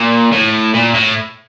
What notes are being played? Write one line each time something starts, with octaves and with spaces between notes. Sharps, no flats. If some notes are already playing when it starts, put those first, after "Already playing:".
Already playing: A#2
A2
A#2
A2